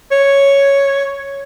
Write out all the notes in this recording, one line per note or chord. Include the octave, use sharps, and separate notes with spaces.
C#5